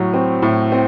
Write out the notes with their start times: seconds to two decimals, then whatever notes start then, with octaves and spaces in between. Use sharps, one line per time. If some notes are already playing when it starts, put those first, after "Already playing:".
Already playing: A2 F#3
0.14 C4
0.42 A2
0.72 C4